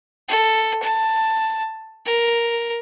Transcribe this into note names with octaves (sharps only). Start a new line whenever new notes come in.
A4
A5
A#4